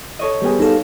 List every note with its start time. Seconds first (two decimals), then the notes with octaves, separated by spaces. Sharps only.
0.19 A4 C#5 D#5
0.42 G3 B3 G#4
0.60 D#4 A4 F5